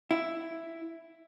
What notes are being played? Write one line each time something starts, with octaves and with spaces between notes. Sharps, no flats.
E4